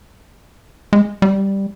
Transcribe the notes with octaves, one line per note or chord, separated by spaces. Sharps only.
G#3
G3